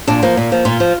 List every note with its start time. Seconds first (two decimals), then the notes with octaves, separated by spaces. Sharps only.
0.08 A#2 D4
0.22 F3 A#3
0.37 A#2
0.52 F3
0.65 A#2 F4
0.80 F3